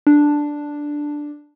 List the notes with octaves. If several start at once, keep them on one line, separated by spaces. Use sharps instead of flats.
D4